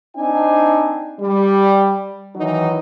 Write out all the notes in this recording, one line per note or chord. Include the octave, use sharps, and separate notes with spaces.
C4 D4 D#4 G#5
G3
D#3 E3 F#3 D#4